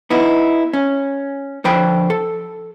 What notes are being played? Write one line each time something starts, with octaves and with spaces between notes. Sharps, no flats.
B3 D#4 E4
C#4
D3 F3 C5 G5 B5
A4